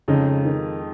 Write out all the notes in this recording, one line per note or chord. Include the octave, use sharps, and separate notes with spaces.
F2 C#3 F3 G#3 D#4
D#3